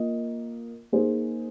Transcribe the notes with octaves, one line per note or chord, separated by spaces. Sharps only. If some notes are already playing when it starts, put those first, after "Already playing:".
Already playing: A#3 F4 A#4 D#5
A#3 D#4 G#4 C5